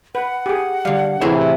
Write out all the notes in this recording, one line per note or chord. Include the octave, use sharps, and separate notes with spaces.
B4 F#5
G4 G#4
D3 G3 F5
A2 C3 E3 E4 G#4 C5 C#5 E5